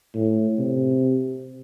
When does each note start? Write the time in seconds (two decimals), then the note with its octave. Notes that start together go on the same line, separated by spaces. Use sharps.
0.15 A2
0.59 C3